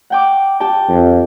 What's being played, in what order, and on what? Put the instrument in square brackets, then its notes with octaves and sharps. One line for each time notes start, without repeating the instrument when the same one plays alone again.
[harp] F#5 G5 D6
G4 G5 A5
[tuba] F2